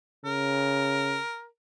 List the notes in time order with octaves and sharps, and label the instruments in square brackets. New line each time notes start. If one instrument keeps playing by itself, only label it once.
[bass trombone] C#3 [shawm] A#4